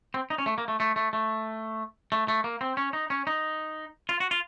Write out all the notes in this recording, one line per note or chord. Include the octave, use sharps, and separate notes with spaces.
C4
D#4
C#4
A3
A#3
A3
A3
A3
A3
A3
A3
A#3
C4
C#4
D#4
C#4
D#4
F4
F#4
F4